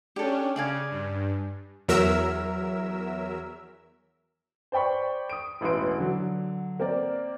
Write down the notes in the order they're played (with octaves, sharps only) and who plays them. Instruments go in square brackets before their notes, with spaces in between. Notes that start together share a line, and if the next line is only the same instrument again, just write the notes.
[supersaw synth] C#4 D4 [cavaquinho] G4 A4
[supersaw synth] C#3 [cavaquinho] D5 F5 G#5
[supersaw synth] G2
E2 F#3 A#4 E5 E6
[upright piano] C5 D5 G5 B5 C#6
D#6 D7
E1 A1 B4 C6 D7
D3 F#3
A#3 C4 A#4 D5